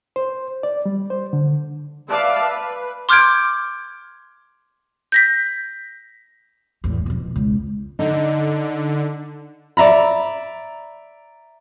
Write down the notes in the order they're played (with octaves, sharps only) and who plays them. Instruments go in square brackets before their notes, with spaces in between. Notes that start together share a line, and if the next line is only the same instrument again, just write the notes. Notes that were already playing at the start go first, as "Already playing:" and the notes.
[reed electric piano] C5
D5
G3
C5
D3
[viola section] B4 D5 E5 F5 A5
B4
[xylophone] C6 D6 F6 G6 G#6 D7
G6 A#6 B6
[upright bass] E2 A2
F2 B2
C#2
[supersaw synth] D3 [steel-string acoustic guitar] D#4
[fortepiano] D5 E5 A#5 B5